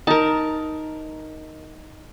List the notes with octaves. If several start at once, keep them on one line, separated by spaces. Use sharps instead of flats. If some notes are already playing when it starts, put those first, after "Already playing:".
D#4 A#4 A5